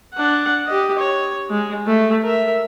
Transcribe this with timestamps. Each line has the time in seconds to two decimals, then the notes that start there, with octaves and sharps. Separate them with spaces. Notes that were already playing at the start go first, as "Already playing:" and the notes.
0.14 D4 F#5
0.67 G4 D#5
0.98 C#5
1.50 G#3
1.87 A3
2.23 A#4 E5